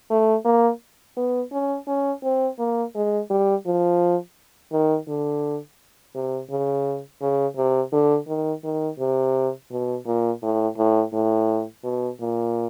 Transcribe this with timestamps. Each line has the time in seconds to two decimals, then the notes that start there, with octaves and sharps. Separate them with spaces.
0.10 A3
0.45 A#3
1.17 B3
1.52 C#4
1.87 C#4
2.23 C4
2.59 A#3
2.95 G#3
3.30 G3
3.66 F3
4.72 D#3
5.08 D3
6.15 C3
6.50 C#3
7.22 C#3
7.57 C3
7.93 D3
8.28 D#3
8.64 D#3
9.00 C3
9.71 B2
10.06 A#2
10.43 A2
10.77 A2
11.13 A2
11.84 B2
12.20 A#2